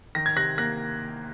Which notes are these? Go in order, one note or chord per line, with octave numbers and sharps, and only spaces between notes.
D#3 A#6
G#6
C3 F#6 A#6
A#3 F#6 A#6